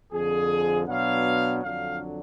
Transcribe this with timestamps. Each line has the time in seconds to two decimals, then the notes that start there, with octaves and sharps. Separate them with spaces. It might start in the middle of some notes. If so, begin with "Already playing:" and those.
0.12 F2 D3 F3 G#4
0.87 B2 F#3 B3 D4 F5
1.63 F2 D3 F#3 D4 F5